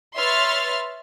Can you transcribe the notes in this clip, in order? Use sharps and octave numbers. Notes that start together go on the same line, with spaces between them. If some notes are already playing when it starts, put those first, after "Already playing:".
B4 C#5 E5 C6 F6 A6